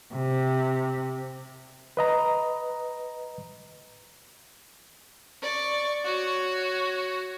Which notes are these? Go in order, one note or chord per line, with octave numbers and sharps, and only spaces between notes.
C3
B4 D#5 A#5
D5 C#6
F#4 C#5